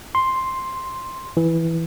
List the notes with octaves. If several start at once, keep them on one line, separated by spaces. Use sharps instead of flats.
C6
E3